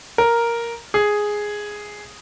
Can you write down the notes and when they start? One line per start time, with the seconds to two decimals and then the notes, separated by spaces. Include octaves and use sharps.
0.18 A#4
0.94 G#4